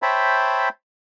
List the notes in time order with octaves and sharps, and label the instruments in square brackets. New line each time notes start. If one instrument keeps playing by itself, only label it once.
[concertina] C5 C#5 E5 G5 A5 B5